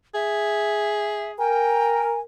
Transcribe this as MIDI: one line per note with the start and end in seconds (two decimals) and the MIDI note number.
0.15 1.42 68
0.15 1.32 76
1.38 2.22 70
1.38 2.04 79
1.38 2.20 80